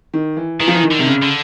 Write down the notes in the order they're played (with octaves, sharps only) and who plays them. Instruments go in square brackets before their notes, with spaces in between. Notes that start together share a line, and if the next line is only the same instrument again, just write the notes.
[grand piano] D#3
E3
[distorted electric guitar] D#3 [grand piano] E3
[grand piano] F3
E3
D#3
[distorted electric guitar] D3
[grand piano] C3
C#3
[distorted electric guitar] D3